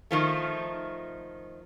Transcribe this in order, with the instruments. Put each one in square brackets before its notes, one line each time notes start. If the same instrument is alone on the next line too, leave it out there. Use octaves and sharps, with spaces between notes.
[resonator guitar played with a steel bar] D#3 F3 A3